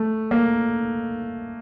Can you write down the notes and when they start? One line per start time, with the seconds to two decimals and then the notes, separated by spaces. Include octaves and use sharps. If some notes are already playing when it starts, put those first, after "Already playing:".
Already playing: A3
0.31 A#3